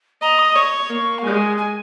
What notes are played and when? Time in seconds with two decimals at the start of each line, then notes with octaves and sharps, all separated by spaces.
0.22 D#5 A#5
0.39 D#6
0.55 C#5 C#6
0.89 A#3
1.18 F5
1.24 G#3 G#5
1.58 G#5